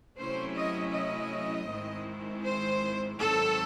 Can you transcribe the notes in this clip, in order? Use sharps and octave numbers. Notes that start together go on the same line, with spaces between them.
C3 F#3 A3 C#4 E4 C5
D#5
D#5
G#2 D#3 G#3 C4 E4
C5
G#2 D#3 F#3 C4 A4